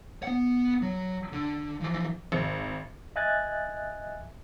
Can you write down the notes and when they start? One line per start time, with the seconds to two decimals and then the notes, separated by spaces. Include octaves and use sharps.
0.23 B3 F#5
0.82 F#3
1.32 D3
1.80 E3 F3
2.32 G#1
3.16 D#5 E5 G#5 F#6 G#6 A6